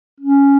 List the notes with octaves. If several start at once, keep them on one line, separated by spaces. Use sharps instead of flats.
C#4